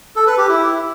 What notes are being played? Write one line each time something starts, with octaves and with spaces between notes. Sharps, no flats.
A4
B4
G4
E4